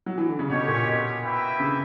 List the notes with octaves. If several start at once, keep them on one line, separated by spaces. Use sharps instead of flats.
F#3
E3
D3
C#3
B2 G3 C#4 G4 C#5
A#2
B2
A#3 E4 B4 E5 G5
C#3